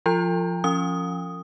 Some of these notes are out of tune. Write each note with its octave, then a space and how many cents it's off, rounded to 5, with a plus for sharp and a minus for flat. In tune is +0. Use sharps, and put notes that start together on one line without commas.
F3 +0 F4 -10 A#5 -10
F3 +0 C#4 +0 D#6 +0